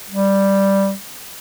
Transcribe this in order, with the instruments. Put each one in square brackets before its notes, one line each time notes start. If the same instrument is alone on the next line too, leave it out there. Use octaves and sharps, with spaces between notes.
[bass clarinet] G3